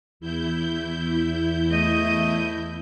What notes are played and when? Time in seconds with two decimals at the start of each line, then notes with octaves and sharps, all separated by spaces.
0.20 E2 E4 G6
1.71 A3 D#5